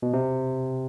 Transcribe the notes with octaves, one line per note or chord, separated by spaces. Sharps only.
B2
C3